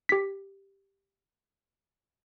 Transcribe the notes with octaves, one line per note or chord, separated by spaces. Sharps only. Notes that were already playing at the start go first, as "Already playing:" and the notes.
G4 B6